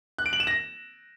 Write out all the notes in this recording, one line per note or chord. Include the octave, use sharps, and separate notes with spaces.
F#6
D7
F#7
E7
A#6